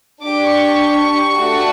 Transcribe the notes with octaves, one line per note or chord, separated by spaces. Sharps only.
D4 G4 D6
C#6
A3 D4 F#4